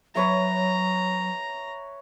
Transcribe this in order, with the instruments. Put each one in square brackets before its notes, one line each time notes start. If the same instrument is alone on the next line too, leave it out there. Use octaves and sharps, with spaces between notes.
[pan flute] F#3 [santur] B4 C#5 E5 [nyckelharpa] A#5